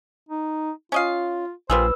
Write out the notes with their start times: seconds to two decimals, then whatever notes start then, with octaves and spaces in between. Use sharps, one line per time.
0.29 D#4
0.92 C#4 F4 D#5 F5
1.70 A#1 G3 F4 G#4 B4 C5 E6